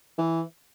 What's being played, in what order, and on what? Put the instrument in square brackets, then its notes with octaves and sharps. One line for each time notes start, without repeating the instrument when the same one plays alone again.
[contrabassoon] E3